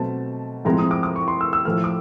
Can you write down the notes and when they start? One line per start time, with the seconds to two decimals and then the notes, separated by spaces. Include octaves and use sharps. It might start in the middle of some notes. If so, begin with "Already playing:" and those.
Already playing: B2 F#3 A3 C4 A5
0.65 A2 F3 G#3 C4 A#5
0.78 D#6
0.91 D6
1.03 D6
1.16 C#6
1.28 C6
1.41 E6
1.53 E6
1.65 A2 F3 A3 F6
1.84 D6